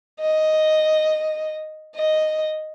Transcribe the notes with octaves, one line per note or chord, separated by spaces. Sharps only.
D#5
D#5